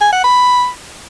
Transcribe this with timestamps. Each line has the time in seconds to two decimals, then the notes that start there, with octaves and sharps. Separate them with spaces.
0.01 G#5
0.12 F#5
0.24 B5